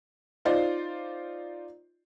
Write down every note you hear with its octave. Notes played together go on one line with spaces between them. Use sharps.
D#4 F4 C5 D5